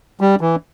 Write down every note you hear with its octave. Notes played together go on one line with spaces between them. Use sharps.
G3
E3